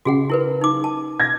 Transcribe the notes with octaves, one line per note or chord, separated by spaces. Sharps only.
C#3 F#4 G#4 F#5
E4 A#4 B4
D#4 D6
A5
G#6 A#6